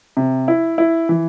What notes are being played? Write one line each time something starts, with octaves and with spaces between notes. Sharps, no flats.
C3
E4
E4
E3